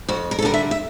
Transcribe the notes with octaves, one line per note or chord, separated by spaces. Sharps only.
F2 F#4
A#4
A4
D3 G3 A#4
E5
E5